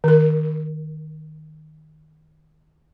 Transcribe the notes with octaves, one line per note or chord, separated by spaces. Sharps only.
D#3 A#4